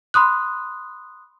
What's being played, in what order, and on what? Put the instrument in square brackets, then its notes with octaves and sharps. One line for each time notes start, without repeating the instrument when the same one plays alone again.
[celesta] B5 C6 D#6 F#6